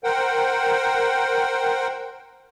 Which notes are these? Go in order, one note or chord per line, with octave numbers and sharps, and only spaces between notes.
A#4 C5 F#5 G5